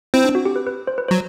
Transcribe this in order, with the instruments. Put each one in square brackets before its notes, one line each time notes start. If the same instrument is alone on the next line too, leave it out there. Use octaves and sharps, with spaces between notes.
[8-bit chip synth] C4 [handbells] E4
[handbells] D4
F#4
G4
B4
B4
C5
B4
[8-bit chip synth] F#3 [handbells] C5